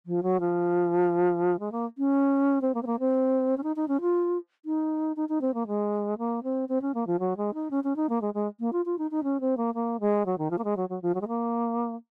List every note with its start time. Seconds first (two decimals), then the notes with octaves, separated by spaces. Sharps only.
0.06 F3
0.23 F#3
0.40 F3
1.59 G#3
1.72 A#3
1.98 C#4
2.61 C4
2.74 A#3
2.82 C4
2.86 A#3
2.99 C4
3.57 C#4
3.63 D#4
3.76 D#4
3.88 C#4
4.01 F4
4.65 D#4
5.16 D#4
5.29 D#4
5.41 C4
5.54 A#3
5.67 G#3
6.18 A#3
6.43 C4
6.69 C4
6.81 C#4
6.94 A#3
7.07 F3
7.19 F#3
7.37 G#3
7.54 D#4
7.71 C#4
7.84 C#4
7.96 D#4
8.09 A#3
8.21 G#3
8.34 G#3
8.60 A#3
8.73 F4
8.85 F4
8.98 D#4
9.11 D#4
9.23 C#4
9.41 C4
9.57 A#3
9.74 A#3
10.00 G#3
10.26 F#3
10.38 D#3
10.51 F3
10.58 A#3
10.64 G#3
10.77 F#3
10.89 F#3
11.02 F3
11.14 F#3
11.21 G#3
11.28 A#3